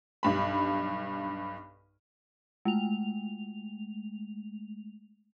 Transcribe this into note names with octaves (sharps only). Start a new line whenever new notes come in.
B1 G2 B5
G#3 A3 F7